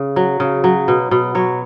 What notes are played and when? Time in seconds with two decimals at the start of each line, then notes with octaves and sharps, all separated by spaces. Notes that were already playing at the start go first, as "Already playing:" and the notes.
Already playing: C#3
0.16 F#3
0.40 C#3
0.64 F#3
0.88 B2
1.11 B2
1.35 F#3 C#5